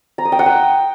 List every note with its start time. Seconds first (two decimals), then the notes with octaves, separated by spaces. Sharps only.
0.18 A#5
0.25 D#6
0.32 G5
0.39 F#5
0.46 G5